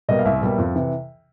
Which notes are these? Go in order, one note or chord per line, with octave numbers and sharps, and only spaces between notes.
B2 G3 A#3 D#5
F5
C2 E5
B2 G3 A#3
F2
C3 E3